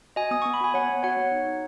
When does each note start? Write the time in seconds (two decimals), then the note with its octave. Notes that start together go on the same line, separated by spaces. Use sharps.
0.16 F#4 D#5 G#5
0.31 B3 D#6
0.42 B3 C#6
0.54 B5
0.61 F#4 G#5
0.74 B3 C#5 F#5
0.89 B3
1.03 F#4 C#5 F#5
1.17 B3
1.32 D#4
1.46 D#4